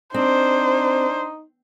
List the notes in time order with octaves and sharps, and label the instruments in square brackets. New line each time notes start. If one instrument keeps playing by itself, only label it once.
[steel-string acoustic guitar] C4 [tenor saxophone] D4 [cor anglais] D#4 [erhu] C5